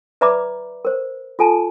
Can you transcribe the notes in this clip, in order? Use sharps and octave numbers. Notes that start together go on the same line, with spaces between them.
B4 D5 E5 A#5 B5 D6
A#4 C5
F4 A4 G#5 A5